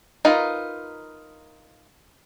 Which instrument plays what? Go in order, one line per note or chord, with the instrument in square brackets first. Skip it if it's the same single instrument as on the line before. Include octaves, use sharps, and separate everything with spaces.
[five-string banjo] D#4 F4 A#4 B4